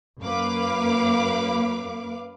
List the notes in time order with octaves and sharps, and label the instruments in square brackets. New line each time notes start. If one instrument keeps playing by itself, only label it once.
[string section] F#2 A#3 B4 F5 D6